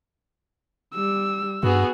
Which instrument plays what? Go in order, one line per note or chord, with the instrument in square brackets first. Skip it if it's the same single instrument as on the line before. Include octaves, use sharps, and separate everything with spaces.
[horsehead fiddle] G3 [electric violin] E6
[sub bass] G2 [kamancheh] B3 G#4 [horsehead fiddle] F#4